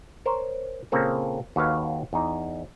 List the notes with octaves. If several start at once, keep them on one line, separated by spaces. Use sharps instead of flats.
A#4 C5 C#5
A#2 C#3 A#3 C4 A4
D#2 F#4 A4 B4 C#5 F5
E2 D#4